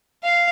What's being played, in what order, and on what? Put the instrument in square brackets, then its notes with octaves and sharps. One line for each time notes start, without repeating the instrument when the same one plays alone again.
[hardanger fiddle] F5